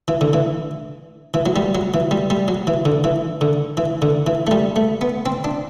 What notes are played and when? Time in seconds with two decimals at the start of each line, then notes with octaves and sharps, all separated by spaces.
0.08 E3
0.21 D3
0.33 E3
1.34 E3
1.46 F#3
1.56 G3
1.75 F#3
1.94 E3
2.11 G3
2.30 G3
2.48 F#3
2.67 E3
2.85 D3
3.04 E3
3.41 D3
3.77 E3
4.02 D3
4.27 E3
4.47 A3
4.51 G3
4.76 A3
5.01 B3
5.26 C4
5.44 D4